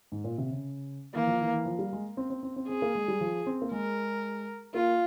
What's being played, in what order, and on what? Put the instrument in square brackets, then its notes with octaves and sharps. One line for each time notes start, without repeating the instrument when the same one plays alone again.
[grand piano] G#2
A#2
C3
C#3
[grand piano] E3 [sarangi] A#3
[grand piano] F3
E3
E3
F3
G3
G#3
C4
C4
C4
C4
[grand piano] C4 [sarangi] G#4
[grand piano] A#3
G#3
G3
F3
C4
A#3
[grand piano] G#3 [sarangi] A#4
[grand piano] A#3 [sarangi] F4